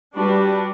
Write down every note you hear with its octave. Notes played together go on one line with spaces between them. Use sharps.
G3 D4 F#4 B4